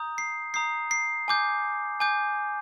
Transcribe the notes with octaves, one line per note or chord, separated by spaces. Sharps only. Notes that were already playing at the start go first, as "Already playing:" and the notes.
Already playing: A#5 D#6 G6
C7
A#5 D#6 G6 C7
C7
G#5 D6 G6
G#5 D6 G6